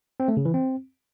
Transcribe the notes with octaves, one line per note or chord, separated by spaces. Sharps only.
C4
A3
C#3
E3
C4